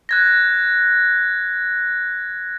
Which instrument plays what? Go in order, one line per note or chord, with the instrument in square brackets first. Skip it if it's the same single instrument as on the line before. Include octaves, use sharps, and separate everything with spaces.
[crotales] F#6 G#6 A#6